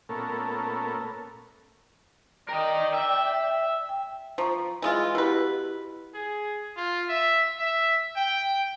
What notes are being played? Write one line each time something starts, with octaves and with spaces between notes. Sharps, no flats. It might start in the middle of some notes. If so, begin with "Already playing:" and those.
A#2 A3 B3 C#4 A4 A#4
A#4 D5 D#5 G5
E5
G5
F3 C5 A#5 C#6
E3 G#3 F4
B2 E4 G4 B4
G#4
F4
E5
E5
G5